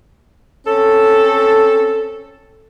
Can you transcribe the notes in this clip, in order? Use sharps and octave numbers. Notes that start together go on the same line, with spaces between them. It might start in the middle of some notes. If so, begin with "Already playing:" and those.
C4 C#4 A4